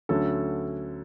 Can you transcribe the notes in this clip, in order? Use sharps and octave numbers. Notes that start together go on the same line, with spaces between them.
D2 D3 F#3 C#4 A4